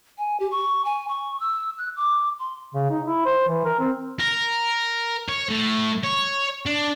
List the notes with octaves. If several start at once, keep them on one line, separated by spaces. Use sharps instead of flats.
G#5
G4
C#6
G#5
C#6
E6
F#6
D6
C6
C#3
D#4
E4
C5
E3
A#4
C4
A#4
C#5
A2
C#5
D4